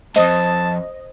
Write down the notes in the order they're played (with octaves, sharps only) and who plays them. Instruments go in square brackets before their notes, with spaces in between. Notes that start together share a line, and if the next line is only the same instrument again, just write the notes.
[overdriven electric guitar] F2 G#2 [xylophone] C5 D#6 [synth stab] D#5 [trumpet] A5